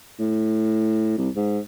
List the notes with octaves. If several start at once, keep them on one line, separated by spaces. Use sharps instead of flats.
A2
C2
G#2